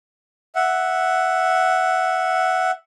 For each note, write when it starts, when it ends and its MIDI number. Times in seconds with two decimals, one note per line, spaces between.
0.55 2.71 76
0.55 2.71 78